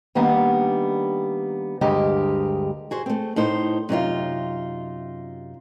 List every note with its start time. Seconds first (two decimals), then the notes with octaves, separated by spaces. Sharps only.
0.15 D#3 G3 A#3 B3 D4
1.81 D2 G2 G#3 G4 A#4 D#5
2.91 F#4 G#4 C5
3.06 A3 C4
3.36 A2 D#4 C5
3.89 F#2 C3 D#4 F4